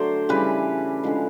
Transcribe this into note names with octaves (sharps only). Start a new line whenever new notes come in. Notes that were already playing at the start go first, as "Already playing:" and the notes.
Already playing: D3 F#3 A3 C5 D5
C#3 E3 G3 B4
D3 F3 G#3